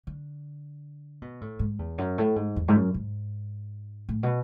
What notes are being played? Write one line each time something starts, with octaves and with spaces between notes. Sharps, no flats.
D3
B2
A2
G#2
E2
F#2
A2
G#2
E2
G#2
F#2
G#2
A2
B2